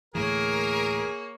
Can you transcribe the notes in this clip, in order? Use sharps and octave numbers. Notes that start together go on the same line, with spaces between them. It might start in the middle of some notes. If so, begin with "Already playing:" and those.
D2 A2 E3 A#3 G#4 A#4 C#5